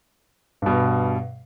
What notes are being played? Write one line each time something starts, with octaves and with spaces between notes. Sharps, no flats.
G2 B2